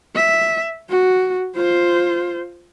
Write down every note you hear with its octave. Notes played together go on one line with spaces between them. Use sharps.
E5
F#4
F4 C5